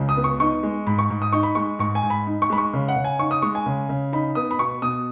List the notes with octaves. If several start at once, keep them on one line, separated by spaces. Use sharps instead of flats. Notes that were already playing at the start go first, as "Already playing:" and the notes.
Already playing: C#2 C#3
D#6
B3
C#6
D#4 C#6
G#3
G#2 B5
C#6
G#2
D#6
D#4 C#6
B5
G#3 C#6
G#2 C#6
G#5
G#2
B5
D#4
C#6
G#3 B5
C#6
C#3
F#5
C#3
G#5
D#4 C#6
D#6
G#3 C#6
G#5
C#3
C#3
D#4 B5
B3 D#6
B5
B2 C#6
B2 D#6